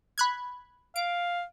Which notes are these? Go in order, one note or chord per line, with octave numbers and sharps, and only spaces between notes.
B5 F#6 G#6
F5 D7